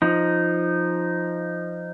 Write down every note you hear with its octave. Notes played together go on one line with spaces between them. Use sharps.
F3 D#4